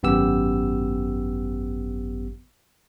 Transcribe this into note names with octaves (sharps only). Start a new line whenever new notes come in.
G#1 F#2 B3 G4 E6